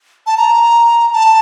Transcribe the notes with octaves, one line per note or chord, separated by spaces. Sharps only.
A5
A#5
A5